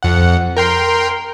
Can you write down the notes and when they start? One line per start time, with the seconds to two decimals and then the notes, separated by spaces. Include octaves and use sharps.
0.03 F2 F#5
0.57 A#4 G5 C6